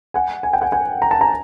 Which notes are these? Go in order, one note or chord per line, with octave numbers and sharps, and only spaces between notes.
F#5 G#5
G#5
G5
F#5 G#5
F#5 G#5
A#5
A5
G#5 A#5